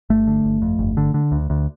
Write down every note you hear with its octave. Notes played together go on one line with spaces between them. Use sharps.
G1 A3
D3
G1
F2
G1
D3
D3
D2
D2